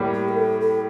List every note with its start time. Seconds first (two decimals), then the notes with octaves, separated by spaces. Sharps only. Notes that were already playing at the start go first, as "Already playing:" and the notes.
Already playing: A2 G3 A#3
0.14 G4
0.28 A#4
0.37 A4
0.61 A4